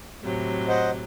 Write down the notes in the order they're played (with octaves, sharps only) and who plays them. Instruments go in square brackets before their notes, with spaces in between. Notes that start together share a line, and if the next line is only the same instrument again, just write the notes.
[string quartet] A2 C3 F#3
[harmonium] C5 D#5 F#5